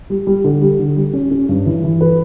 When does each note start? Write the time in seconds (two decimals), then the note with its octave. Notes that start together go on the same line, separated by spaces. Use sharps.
0.10 G3
0.27 G3
0.44 D3
0.62 G3
0.79 D3
0.96 G3
1.13 C#4
1.31 C#4
1.49 G2
1.66 E3
1.84 E3
2.01 B4